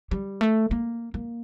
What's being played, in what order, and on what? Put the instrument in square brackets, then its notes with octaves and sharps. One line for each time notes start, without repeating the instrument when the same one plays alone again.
[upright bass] G3
A3
A#3
A#3